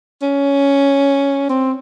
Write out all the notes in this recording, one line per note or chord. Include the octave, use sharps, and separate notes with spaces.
C#4
C4